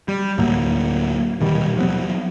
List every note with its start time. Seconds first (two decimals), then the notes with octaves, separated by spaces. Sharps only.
0.08 G3
0.38 D2 A2 F#3 A#3
1.40 D#1 B2 D#3 G3
1.77 F3 F#3 B3